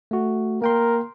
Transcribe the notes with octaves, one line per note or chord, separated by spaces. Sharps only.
A3 F#4
A#3 A#4 G5 C6